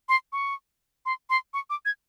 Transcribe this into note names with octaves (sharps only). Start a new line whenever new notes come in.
C6
C#6
C6
C6
C#6
D6
G#6